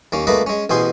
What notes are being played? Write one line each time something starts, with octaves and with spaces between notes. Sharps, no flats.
D#2 A#3 C#4
C#2 A3 A#3 B4 D#5
G#3 C#4
A1 B2 G#4 C5 C6